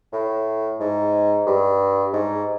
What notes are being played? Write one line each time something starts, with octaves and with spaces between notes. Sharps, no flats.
A2
G#2
G2
G#2